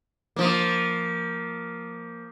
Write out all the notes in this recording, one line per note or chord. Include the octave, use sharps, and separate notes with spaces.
F3 A#3